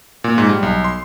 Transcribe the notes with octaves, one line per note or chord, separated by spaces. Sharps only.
A#2
G#2
G3
B1
C6